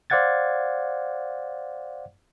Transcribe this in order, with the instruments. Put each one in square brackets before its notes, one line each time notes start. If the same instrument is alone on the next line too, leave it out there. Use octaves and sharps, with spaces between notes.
[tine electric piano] C5 D5 F5 F#5 G#6 A6